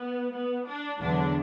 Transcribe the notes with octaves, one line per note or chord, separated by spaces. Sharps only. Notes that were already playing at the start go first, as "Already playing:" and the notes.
Already playing: B3
B3
D4
E2 D3 F#3 D4